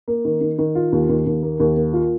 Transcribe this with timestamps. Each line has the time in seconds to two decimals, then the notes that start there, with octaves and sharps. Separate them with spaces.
0.08 A#3
0.25 D#3
0.41 D#3
0.59 D#3
0.75 F4
0.92 D#2
1.09 D#2
1.26 D#2
1.43 A#3
1.60 D#2
1.77 A#3
1.93 F4